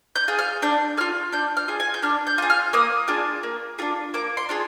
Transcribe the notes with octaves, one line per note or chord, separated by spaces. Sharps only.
G6
F4 G#4
F6
D4 G6
F4 G#4 F6
D4 G6
F6
F4 G#4
G#5
G6
D4 F6
G6
F4 G#4
F6
A#3 D#6
D4 F4 G#4
A#3
D4 F4 G#4
A#3 D6
C6
D4 F4 G#4